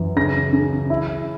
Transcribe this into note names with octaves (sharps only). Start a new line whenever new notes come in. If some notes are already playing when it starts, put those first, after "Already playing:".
Already playing: F#2 E3
C#3 A#6
C#3
E4